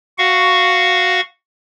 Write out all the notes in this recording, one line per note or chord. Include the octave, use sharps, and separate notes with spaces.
F#4 F5 F#5 C#6